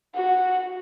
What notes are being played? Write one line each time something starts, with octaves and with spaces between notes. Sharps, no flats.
F#4